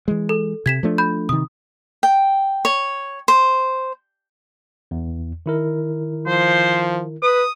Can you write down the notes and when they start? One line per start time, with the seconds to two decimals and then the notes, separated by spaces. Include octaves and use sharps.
0.08 E3 G#3
0.29 A4
0.66 C3 G#6 B6 E7
0.83 F3 A3 D4
0.98 B5 G6
1.29 C3 D#3 D#6
2.03 G5
2.65 C#5
3.28 C5
4.91 E2
5.46 D#3 E4 A#4
6.27 F3 C5
7.22 B4 D#6